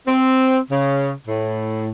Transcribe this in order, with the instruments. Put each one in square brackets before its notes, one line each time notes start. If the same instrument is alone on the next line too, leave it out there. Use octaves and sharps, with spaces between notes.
[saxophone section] C4
C#3
A2